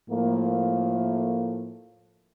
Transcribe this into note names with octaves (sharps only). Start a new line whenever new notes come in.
A2 F3 A3 A#3